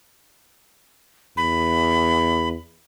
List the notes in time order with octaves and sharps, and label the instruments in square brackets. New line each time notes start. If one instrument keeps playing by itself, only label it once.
[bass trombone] E2 [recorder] B5